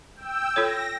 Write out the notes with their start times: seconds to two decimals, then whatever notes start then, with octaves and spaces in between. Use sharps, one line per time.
0.16 G5 E6
0.56 F4 A4 C#5 A#6